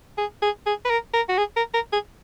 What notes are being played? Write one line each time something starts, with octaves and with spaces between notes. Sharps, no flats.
G#4
G#4
G#4
B4
A#4
A#4
F#4
G#4
A#4
A#4
G#4